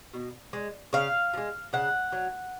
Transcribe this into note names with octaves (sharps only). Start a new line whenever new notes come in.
B2
G#3
C#3 F5
F3
G#3
C#3 F#5
F#3